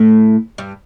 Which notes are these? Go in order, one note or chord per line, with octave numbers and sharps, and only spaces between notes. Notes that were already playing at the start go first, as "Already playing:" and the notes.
Already playing: A2 A3
G2 G3